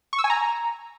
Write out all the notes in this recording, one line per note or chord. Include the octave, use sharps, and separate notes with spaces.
C#6
E6
G#5
A#5